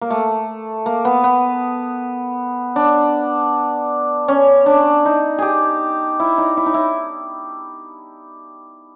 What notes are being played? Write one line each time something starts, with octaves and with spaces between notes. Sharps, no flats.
A#3
A3
A#3
B3
B3
D4
C#4
D4
D#4
G4 G#4
E4
D#4
E4
D#4
E4